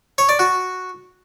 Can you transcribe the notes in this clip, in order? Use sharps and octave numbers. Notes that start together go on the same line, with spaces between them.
C#5
D5
F#4